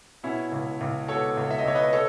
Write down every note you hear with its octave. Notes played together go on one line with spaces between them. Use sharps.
B2 C#4 E4
C#2
C#2
B2 A4 C#5
C#2
E5
D#5
C#2 C#5
B4 D#5
A4 C#5